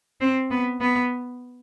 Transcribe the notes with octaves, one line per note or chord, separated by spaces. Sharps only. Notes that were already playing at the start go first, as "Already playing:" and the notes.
C4
B3
B3